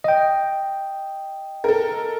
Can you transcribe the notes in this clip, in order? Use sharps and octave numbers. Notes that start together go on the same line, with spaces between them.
D#5 G5
A4 A#4